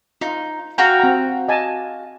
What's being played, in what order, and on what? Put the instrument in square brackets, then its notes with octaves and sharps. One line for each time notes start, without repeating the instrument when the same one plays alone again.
[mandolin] D#4 [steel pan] F4
[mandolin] F#4 F5 G5 [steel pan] A#5
[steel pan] C4 A#5
D#5 G#5 A5